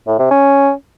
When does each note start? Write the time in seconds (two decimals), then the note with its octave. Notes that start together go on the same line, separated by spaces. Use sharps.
0.07 A2
0.19 C3
0.31 C#4